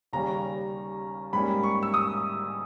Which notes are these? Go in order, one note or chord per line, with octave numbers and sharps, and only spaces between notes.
D#2 C#3 G3 C#4 A#5
G#2 G3 A#3 C#4 B5
C#6
E6
D#6